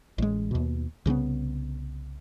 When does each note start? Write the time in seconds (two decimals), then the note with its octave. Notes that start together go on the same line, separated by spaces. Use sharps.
0.18 A1 G#3
0.51 D#2 B2
1.06 C2 C#3 G#3 B3